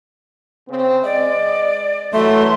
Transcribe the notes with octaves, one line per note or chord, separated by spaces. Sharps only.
C#3 C4
G#3 D5 D#5
E3 F#3 A3 C6